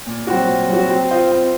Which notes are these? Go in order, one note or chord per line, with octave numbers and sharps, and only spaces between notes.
A#2
F#3 C4 F#4
A#2
F#3 C4 F#4
C4
F4 C5 D#5
C4